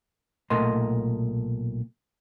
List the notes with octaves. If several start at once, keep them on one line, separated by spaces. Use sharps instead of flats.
B1 A#2 A3 A#4 D#5 C6